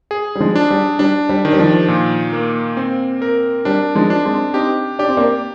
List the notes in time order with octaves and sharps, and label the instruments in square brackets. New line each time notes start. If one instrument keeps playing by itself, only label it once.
[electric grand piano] G#4
[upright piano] G3
F3 G#3
[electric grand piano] D4
[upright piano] G3
[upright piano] G3 [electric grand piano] D4
[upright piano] G3
[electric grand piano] D#3
[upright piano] G3
F3
[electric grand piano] A#2
A#3
C4
A#4
[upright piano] G3 [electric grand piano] D4
[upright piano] F3 G#3
[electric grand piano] D4
[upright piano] G#3 C4
[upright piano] C4 D#4 [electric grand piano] G4
[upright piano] D4 [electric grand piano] G4
[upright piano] C4
A#3 D4